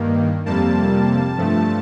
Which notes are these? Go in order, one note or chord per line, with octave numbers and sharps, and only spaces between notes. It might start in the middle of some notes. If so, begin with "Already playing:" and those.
Already playing: G2 D#3 A#3
F2 C3 G3 A#3 A5
G2 F3 A3